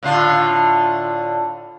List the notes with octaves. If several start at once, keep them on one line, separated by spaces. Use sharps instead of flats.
A2 D3 F4